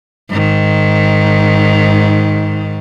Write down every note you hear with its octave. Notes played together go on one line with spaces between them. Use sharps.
G#2 D#3